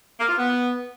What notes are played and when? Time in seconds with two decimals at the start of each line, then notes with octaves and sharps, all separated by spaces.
0.20 A#3
0.29 F4
0.38 B3